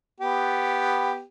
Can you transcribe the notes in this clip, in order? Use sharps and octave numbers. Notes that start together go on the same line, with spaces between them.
B3 G4